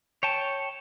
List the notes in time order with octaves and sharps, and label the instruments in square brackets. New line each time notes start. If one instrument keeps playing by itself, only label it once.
[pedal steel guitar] C#5 G5 A5